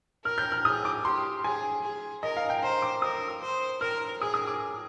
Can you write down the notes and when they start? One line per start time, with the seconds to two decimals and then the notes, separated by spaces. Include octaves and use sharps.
0.25 A#4 F6
0.38 G6
0.52 F6
0.65 G#4 D#6
0.85 D6
1.05 G4 C6
1.44 G#4 G#5
1.83 G#4
2.23 A#4 D#5
2.37 F5
2.50 G5
2.63 C5 A#5
2.82 D6
3.02 A#4 D#6
3.42 C5
3.81 A#4 F6
4.21 G#4 D#6
4.34 D#6
4.47 D6